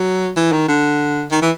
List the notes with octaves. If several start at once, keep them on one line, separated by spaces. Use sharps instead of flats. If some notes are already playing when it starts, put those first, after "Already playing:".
Already playing: F#3
E3
D#3
D3
D#3
E3